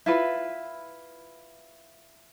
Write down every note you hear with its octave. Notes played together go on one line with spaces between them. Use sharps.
E4 F4 B4